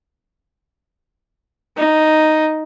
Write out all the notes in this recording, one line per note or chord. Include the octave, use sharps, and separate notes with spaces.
D#4